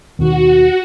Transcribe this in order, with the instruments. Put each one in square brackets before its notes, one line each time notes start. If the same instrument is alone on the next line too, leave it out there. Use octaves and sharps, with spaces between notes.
[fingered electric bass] D#2 B2 D#3 [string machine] F#4